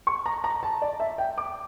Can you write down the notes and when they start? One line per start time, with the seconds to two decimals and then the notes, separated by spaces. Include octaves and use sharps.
0.07 C#6
0.26 A#5
0.44 A#5
0.63 A5
0.82 D5
1.00 E5
1.18 G5
1.38 D6